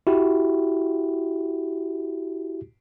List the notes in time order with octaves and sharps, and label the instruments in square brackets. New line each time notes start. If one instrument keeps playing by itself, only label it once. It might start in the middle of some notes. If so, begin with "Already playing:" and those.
[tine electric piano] E4 F#4 G4